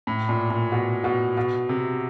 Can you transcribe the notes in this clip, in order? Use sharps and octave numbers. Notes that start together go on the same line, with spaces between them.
A2
A#2
A#2
B2
B2
B2
C3